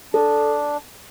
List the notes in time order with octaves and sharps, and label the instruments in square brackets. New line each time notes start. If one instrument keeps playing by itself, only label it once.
[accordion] D4 [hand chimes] A4